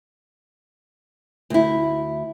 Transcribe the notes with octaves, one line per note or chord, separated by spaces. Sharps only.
D2 E4